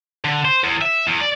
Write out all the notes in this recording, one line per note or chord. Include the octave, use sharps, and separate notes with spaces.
D3
C5
E2
E5
E2
D5